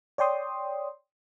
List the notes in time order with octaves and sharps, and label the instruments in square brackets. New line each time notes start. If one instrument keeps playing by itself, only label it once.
[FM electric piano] C#5 D5 G5 C6 D#6